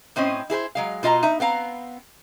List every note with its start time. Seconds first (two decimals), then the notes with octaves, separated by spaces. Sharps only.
0.16 A2 C4 C#4 C5 D#5
0.50 E4 G#4 B4 C5
0.75 F#3 G#3 F5
1.03 B2 F4 D#5 E5 A#5
1.23 D#4 E5
1.40 B3 C4 F5 A#5